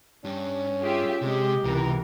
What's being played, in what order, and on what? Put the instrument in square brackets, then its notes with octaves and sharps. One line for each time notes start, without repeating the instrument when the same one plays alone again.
[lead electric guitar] G2 [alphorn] C#4
[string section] F4 G4 E5 [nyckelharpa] G#4
[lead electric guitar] C3 [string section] G#3 [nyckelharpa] G4
[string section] C#2 E3 A#4 [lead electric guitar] C3